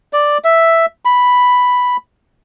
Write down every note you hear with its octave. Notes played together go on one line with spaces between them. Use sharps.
D5
E5
B5